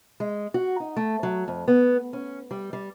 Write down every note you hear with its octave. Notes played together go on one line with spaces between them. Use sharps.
G#3
F#4
D#4
A3
F#3
F2
B3
C#4
G3
G3